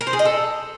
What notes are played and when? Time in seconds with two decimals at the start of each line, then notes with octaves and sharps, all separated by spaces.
0.01 A#4
0.07 C5
0.13 G#4
0.19 D#5
0.25 A4